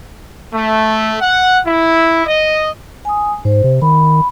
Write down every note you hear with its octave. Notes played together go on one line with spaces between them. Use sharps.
A3
F#5
E4
D#5
G#5 D#6
G#2 C5
C3
D#3 B5